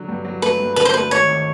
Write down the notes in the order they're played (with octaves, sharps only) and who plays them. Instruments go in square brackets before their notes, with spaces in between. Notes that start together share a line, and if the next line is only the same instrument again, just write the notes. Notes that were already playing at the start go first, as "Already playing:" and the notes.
Already playing: [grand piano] D3 F#3
G2
F#3
[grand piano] A3 [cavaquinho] B4
[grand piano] G2
[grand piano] D3 [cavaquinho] B4
[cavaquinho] C5
[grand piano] A3 [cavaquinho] B4
[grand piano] G#1 [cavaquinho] C#5
[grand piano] G#1